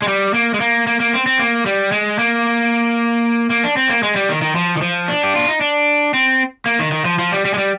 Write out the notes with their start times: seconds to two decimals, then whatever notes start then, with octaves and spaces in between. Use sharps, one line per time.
0.02 G#3
0.08 G3
0.34 A#3
0.54 G#3
0.60 A#3
0.87 A#3
1.00 A#3
1.13 C4
1.26 C4
1.39 A#3
1.66 G3
1.92 G#3
2.19 A#3
3.50 A#3
3.64 D4
3.77 C4
3.89 A#3
4.03 G#3
4.16 G3
4.29 D#3
4.42 D#3
4.55 F3
4.77 D#3
4.82 F3
5.08 D4
5.23 G4
5.35 F4
5.48 D#4
5.61 D4
6.14 C4
6.66 A#3
6.79 D#3
6.92 D#3
7.05 F3
7.19 F3
7.32 G3
7.45 G3
7.54 G#3
7.58 G3